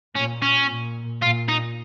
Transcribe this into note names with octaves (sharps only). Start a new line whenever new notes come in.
A#2 C#4
C#4
A#2
A#2 F4
D#4